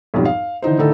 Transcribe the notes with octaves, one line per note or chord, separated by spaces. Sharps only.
B1 F2 G#2 G3
F5
D3 E3 D#4 C5
A2 D3 D#3 D#4 A4